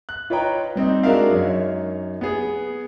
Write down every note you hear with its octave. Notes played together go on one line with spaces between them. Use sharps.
F#6
F4 B4 C#5 D#5 G5 A#5
G3 C4 D#4
G#3 D4 F#4 A#4 E5 F5
F#2 D#4 C#5
B3 G#4